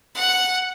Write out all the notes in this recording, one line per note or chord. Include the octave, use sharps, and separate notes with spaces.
F#5